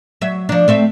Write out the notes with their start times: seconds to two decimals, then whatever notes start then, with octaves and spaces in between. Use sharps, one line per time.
0.21 F#3 E5
0.49 F3 D4
0.68 A3 C4 E5